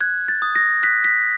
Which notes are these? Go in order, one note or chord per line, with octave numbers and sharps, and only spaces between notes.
F#6 G#6
A6
D#6
A#6
F#6 B6
B6